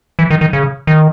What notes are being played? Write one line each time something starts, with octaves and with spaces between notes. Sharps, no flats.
E3
D#3
D#3
C#3
D#3